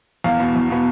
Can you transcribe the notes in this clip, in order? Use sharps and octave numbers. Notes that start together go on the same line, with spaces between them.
E2 F5
B2 B3
E2
B2 B3